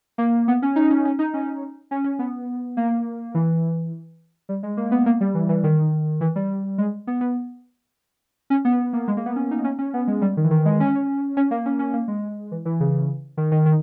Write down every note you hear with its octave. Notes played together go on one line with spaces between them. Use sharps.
A#3
B3
C#4
D#4
C#4
C#4
D#4
C#4
C#4
C#4
B3
A#3
E3
G3
G#3
A#3
B3
A#3
G3
E3
E3
D#3
E3
G3
G#3
B3
B3
C#4
B3
A#3
G#3
A#3
B3
C#4
D#4
C#4
C#4
B3
G#3
G3
D#3
E3
D#3
G#3
C#4
C#4
A#3
C#4
C#4
A#3
G#3
E3
E3
C#3
D#3
D#3
D#3